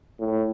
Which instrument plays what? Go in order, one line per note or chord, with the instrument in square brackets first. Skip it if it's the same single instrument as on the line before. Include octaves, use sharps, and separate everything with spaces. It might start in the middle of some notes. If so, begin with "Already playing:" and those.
[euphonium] A2